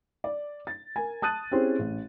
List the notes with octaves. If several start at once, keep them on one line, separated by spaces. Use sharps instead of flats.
D5
A6
A#4 G#5
A5 D#6 F#6 A6 D#7
C4 C#4 E4 G4 G#4 C5
A1